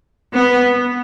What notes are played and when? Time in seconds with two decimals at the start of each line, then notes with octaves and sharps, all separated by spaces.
0.34 B3